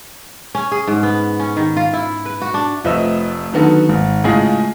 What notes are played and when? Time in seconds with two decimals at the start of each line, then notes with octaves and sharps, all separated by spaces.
0.55 C#4
0.72 G#4
0.88 G#2
1.03 B3
1.39 C#4
1.57 D#3
1.77 F4
1.93 E4
2.25 B4
2.42 F#4
2.54 D4
2.84 F1 F3 A3 B4 D#5 E6
3.53 D3 D#3 F#3 B3 F#4 A4
3.89 G#1
4.24 A2 C#3 G#3 F4 G#4